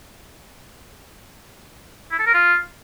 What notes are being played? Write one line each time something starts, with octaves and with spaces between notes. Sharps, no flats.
E4
A4
A#4
F4